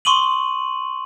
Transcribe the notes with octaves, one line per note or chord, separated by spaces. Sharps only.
C6 C#6 D#6 D#7 F#7